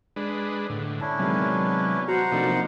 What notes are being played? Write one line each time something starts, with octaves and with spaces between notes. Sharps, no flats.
G#3 D4 B4
A2 D3
C#4 D4 E4 A5
C3 D#3 F#3 G#3 B3
F#4 C5 F#5 A#5
C3 F3 A3 A#3 D4 D#4